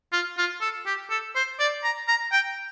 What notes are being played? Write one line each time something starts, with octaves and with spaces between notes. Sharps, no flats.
F4
F4
A4
G4
A4
C5
D5
A#5
A#5
G5